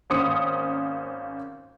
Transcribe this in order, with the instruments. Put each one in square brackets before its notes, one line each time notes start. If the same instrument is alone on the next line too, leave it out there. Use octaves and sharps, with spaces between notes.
[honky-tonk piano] G#1 A#3 C#4 C5 D#6 C#7